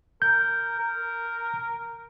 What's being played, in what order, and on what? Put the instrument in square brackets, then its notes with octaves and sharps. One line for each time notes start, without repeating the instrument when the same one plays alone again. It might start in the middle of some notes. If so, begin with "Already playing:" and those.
[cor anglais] A#4 [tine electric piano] G6
[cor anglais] A#4